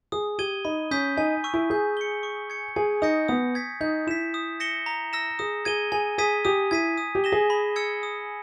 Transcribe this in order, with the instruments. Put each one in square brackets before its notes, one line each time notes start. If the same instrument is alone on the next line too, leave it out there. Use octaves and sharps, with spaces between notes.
[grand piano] G#4 [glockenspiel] D#6
[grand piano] G4 [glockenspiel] G#6 D#7 G7
[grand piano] D#4 [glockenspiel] B5
[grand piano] C#4 [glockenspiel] D#6 G6 B6
[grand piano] D#4 [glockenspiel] G#5
[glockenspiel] C#6 E6
[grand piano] E4
[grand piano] G#4 [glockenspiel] G6
[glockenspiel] C#7 G7
C#6
G#6 C#7
[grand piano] G#4 [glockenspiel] G#5
[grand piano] D#4 [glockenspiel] D#6 G6 A#6 C#7
[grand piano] B3 [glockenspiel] D#6
[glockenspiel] G#6 B6
[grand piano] D#4 [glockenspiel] G6
[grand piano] E4 [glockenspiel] B6 E7
[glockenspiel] D#6
A#6 C#7 E7 G7
A#5
E6 A#6 E7
[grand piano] G#4 [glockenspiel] D#6
[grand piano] G#4 [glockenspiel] G#6 D#7 G7
[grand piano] G#4 [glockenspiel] G#5
[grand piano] G#4 [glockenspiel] D#6 G#6 B6 D#7
[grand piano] G4 [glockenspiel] D#6
[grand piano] E4 [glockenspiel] G#6 B6 D#7
[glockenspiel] D#6
[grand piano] G4
[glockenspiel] A#6 E7 G7
[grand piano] G#4
[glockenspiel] B5
E6 G#6 C#7
D#6